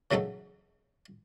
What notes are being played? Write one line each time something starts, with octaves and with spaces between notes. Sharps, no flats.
C#3 E3 F#3 D#4 A4